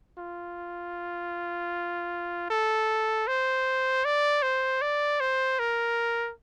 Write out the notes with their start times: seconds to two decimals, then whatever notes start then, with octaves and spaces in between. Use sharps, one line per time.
0.18 F4
2.50 A4
3.27 C5
4.05 D5
4.42 C5
4.81 D5
5.20 C5
5.59 A#4